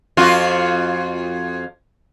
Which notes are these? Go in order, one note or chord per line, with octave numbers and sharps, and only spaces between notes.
F2 F4 F#4